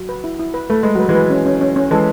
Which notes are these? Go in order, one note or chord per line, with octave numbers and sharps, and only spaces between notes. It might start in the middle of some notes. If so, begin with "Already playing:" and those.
Already playing: F#3
B4
E4
E4
B4
A3 B4
G#3 B4
F#3 B4
E3 G#3
B4
C#4
C#4
C#4
C#4
E3 G#3 A4